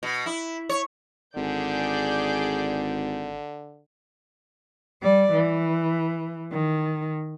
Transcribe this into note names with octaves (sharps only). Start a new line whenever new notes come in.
B2
E4
C#5
G#1 D3 G#4 D5 G6
G3 D5
E3
D#3